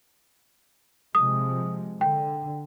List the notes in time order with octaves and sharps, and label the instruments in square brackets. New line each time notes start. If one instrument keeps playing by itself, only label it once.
[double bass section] C3 F3 G#3 [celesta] D#6
[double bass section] D3 [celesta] G5